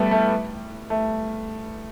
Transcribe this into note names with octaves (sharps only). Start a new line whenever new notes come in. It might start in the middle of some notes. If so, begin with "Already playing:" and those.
Already playing: G3 A3 B3 E4
A3
A3